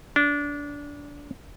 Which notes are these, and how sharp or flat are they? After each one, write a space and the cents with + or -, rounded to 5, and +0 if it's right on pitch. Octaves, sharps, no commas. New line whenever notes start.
D4 -20